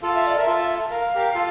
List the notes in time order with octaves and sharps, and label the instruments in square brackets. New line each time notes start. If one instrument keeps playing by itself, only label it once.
[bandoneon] F4 A4 [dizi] F5
[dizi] E5
D5
[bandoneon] A#4 [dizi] E5
[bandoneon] F4 A4
[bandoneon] A#4 [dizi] F5
[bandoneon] G4 A#4
F4 A4